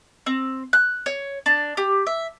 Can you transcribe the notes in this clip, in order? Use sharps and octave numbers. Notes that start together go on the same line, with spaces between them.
C4
F#6
C#5
D4
G4
E5